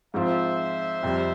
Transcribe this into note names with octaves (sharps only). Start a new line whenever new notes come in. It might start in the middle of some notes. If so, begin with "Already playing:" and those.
G#2 F3 C4 F4 C5 E5
F2 C3 G3